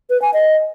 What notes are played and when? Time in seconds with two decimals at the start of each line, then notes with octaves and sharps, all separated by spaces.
0.10 B4
0.22 G#5
0.34 D#5